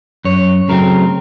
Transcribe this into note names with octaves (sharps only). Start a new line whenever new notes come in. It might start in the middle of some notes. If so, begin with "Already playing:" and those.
F#2 C#5
C#3 F#3 A3 C4 A#4